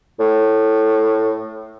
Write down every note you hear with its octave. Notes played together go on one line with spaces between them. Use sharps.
A2